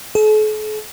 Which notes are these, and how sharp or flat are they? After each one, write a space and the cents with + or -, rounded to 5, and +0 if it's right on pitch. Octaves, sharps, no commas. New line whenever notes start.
A4 -45